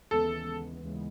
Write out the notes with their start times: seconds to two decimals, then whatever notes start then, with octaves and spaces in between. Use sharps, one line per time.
0.11 D#2 C#3 E3 G#3 B3 A4
0.83 D#2 C#3 E3 G#3 B3